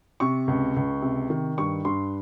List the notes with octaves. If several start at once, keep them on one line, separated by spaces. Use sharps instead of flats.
C3 C#6
C#2
C#2
C3
D#3
G2 C#6
G2 C6